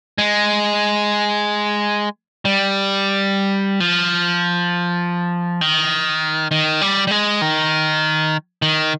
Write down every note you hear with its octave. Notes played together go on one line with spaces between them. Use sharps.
G#3
G3
F3
D#3
D#3
G3
G3
G#3
D#3
D#3